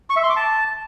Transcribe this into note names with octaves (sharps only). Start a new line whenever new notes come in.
C#6
E5
C6
D6
A5